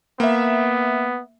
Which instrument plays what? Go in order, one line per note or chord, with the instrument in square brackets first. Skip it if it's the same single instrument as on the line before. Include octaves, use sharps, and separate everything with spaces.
[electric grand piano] A#3 E5 [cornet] B3